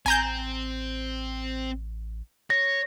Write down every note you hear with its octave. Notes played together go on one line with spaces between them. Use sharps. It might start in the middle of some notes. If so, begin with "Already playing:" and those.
A1 C4 G#5 A#5 G6
C#5 A#6